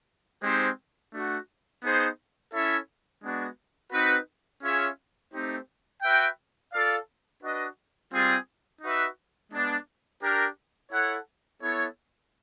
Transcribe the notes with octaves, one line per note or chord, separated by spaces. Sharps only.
G#3 C4 D#4 G4 C5
A3 D4 F#4
B3 D#4 G#4 C5
C#4 E4 A4 C#5 E5
G#3 B3 D4 F#4
C4 D#4 F#4 B4
C#4 F4 G#4 C#5 E5
A3 C4 D#4 G4 C5
F#4 B4 E5 G5
F4 A4 D5 F5
D4 F#4 B4 D#5
G3 C4 F4 G#4
D#4 F#4 B4 E5
G#3 B3 D4
D4 G4 A#4
E4 A4 C#5 F#5
B3 E4 A4 C#5